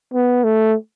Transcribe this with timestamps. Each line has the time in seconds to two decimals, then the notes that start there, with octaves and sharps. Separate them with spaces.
0.14 B3
0.44 A3